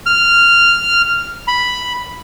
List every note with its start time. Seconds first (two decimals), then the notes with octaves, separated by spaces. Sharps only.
0.06 F6
1.48 B5